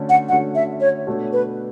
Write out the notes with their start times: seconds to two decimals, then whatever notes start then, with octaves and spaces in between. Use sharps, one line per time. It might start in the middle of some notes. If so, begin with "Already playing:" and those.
Already playing: D3 A3 C#4 F#4
0.09 F#5
0.29 D3 A3 C#4 F#4 F#5
0.55 E5
0.81 C#5
1.07 B2 A3 D4 F#4 A4
1.33 B4